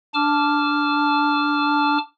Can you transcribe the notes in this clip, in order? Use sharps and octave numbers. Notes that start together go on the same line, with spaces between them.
D4 A5 D6 F6